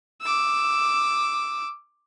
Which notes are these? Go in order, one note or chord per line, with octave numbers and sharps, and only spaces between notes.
D6 E6